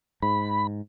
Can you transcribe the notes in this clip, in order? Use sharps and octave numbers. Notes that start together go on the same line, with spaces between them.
G#2 B5